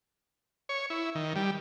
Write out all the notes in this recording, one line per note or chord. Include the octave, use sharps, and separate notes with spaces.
C#5
E4
D#3
G3